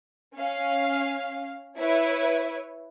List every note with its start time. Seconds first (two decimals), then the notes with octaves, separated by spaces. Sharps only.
0.35 C#4 F5
1.79 E4 B4 C#5 E5